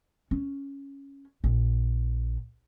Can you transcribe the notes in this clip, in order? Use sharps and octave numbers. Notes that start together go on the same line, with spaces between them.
C#4
A#1